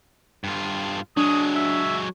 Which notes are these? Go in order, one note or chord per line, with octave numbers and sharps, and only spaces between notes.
G2 F4
F#3 G#3 D4 D#6
E5